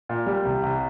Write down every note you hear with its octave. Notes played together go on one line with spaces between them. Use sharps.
A#2
G3
C2
C2